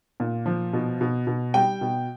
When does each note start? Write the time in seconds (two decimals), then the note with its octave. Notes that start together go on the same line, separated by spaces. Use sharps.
0.20 A#2
0.46 F3
0.73 B2
1.01 B2
1.27 B2
1.54 G3 G5
1.81 B2